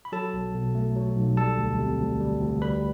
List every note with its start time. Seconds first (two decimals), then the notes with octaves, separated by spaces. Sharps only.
0.05 B5
0.12 F#3 A4 A5
0.33 B1
0.55 B2
0.75 A3
0.96 F#3
1.17 B1
1.37 G3 A4 A5
1.58 D2
1.79 C3
1.99 D2
2.21 G3
2.41 D2
2.62 G3 B4 B5